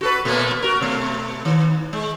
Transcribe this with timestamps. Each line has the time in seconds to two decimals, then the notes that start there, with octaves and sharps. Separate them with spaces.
0.01 F#4 A4 B4
0.25 A#2 A3 A#3
0.62 F#4 A#4
0.81 B2 A3
1.45 D#3
1.93 G#3